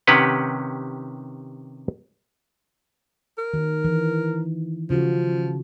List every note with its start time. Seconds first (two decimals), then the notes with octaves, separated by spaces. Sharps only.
0.07 C3 D#3 C#4 G4 B4 F#5
3.38 A#4
3.54 D#3
3.84 E3
4.90 C#3 F3 F4 F#4